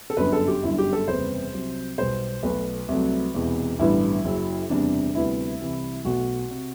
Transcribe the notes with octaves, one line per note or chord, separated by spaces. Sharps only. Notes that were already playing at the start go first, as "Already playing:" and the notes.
A4
G1 F#2 D3 B4
A4
G4
G1 F#2 D3 G3 E4
G4
A4
F#1 E2 C3 G3 B3 C5
C2 C3 F#3
B1 B2 G3 B3 C5
B1 B2 F#3 A3 B4
C2 C3 F#3 A3
E1 E2 C3 E3
A1 G2 D3 G3 B3 E4
F#1 F#2 F#3
F#1 E2 C3 G3 D4
D2 C3 G3 B3 E4
C2 C3 E3
B1 B2 A3 F#4
C3